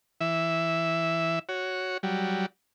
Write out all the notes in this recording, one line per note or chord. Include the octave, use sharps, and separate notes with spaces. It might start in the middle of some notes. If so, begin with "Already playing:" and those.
E3 E5
F#4 C#5
F#3 G3